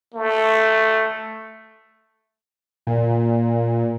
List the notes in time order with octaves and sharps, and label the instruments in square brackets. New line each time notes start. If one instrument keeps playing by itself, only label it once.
[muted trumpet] A3
[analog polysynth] A#2